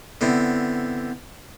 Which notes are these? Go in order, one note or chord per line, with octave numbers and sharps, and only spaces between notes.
D3 B3 C4 E4